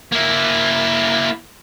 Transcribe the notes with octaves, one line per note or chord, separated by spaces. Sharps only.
A#3 E4